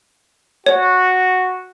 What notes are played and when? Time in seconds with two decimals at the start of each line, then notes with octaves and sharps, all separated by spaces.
0.66 F#4 C#5